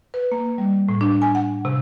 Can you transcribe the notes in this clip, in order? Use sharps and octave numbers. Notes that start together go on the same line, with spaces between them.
B4
A#3
G3
A2
D4
G#5
F#5
C3